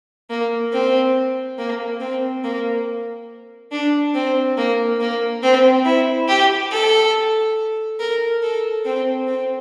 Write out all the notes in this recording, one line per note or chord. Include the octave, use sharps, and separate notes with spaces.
A#3
C4
A#3
C4
A#3
D4
C4
A#3
A#3
C4
E4
G4
A4
A#4
A4
C4
C4